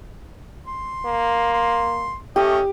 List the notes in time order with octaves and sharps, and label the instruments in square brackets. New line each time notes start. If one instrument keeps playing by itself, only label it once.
[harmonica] C6
[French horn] A#3
[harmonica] C6
[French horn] A3 [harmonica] C#4 D#5 [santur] G4